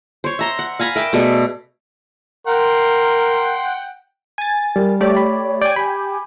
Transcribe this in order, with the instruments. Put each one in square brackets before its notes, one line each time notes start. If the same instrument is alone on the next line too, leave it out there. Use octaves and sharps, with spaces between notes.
[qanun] C5 C#5
E5 A#5 C6
F#5
F5 G#5 A#5 B5
A#4 E5 G5 D6
B2 A3 G#4 D5
[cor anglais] A#4 [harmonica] F#5 G5 [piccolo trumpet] C6
[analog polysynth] G#5 A6
[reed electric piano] G3 [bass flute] A#4
[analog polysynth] A3 G4 D5 [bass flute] C#5
[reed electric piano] B5
[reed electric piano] D5 [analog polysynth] G5 G#5
[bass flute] G4 [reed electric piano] B5